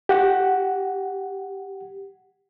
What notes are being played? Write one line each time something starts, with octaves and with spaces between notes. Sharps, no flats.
G4 F#5